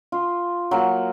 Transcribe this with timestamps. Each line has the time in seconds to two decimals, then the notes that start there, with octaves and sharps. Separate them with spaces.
0.12 F4
0.71 F#3 A#3